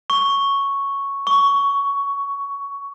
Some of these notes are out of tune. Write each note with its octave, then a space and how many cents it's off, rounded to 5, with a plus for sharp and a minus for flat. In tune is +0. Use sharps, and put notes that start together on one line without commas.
C#6 +0
C#6 +15